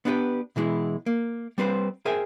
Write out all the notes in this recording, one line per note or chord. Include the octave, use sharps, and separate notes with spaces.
B3 D4 E4 F4 G4 B4
B2 E3 G#3 E4
A#3
G3 C4 B4 C5
G#4 A#4 C5 E5 G5 G#5